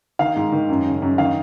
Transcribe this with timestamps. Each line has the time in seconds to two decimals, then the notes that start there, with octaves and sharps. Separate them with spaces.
0.19 D#3 F5
0.36 G#2
0.52 D#3
0.69 F#2
0.86 C#3
1.02 F#2
1.18 D#3 F5